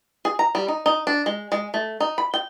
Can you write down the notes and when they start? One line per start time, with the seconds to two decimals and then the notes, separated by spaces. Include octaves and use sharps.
0.25 G#4
0.39 A#5
0.55 G3
0.68 D#4
0.86 D#4
1.07 D4
1.26 G#3
1.52 G#3
1.74 A3
2.00 D#4
2.18 B5
2.34 G5